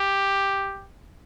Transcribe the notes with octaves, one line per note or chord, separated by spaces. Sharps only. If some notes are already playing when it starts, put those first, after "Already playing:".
Already playing: G4